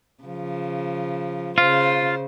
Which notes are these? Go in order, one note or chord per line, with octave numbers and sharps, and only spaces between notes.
C#3 F3
C#3 F4 C5